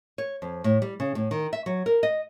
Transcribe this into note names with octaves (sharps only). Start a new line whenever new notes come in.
C#5
F2
A2
G3
C#3
A2
D#3
E5
F#3
A#4
D#5